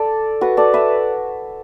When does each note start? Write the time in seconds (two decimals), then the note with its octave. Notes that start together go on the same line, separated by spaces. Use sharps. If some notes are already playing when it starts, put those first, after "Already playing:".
Already playing: A4 D5
0.41 F#4 B4
0.57 A4 D5
0.74 B4 E5